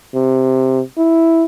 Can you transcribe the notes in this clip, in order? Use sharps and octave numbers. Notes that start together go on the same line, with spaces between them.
C3
E4